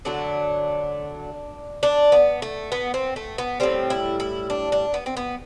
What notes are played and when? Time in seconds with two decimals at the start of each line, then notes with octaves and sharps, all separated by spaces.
0.05 D3 F#3 A3 D4
1.83 D4
2.12 B3
2.42 A3
2.72 B3
2.94 C4
3.16 A3
3.38 B3
3.60 A2 G3 C4
3.90 E4
4.20 E4
4.50 D4
4.72 D4
4.94 B3
5.06 C4
5.17 B3